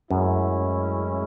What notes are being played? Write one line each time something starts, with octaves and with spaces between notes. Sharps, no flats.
F#2 A2 G#3 C#4 E4